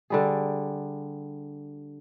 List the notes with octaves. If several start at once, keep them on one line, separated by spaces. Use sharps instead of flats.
D3 G3 G#4